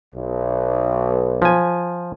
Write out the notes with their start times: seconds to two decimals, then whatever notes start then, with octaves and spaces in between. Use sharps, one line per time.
0.15 B1
1.42 F3 G#5